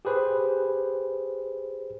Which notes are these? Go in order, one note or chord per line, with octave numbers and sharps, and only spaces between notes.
G4 G#4 B4 C5